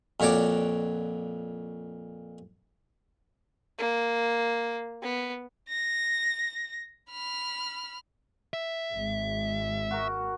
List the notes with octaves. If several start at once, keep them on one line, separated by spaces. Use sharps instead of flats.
F2 A#2 F#4 C#5 D5 D6
A#3
B3
A#6
B5 F6
E5
G#1 G#3
F#4 A#4